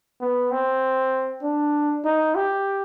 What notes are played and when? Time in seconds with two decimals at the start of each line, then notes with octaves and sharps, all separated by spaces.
0.21 B3
0.52 C4
1.43 D4
2.04 D#4
2.35 G4